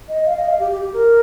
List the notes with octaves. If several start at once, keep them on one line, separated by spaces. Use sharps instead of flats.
D#5
F5
D#5
F5
G4
G4
G4
A#4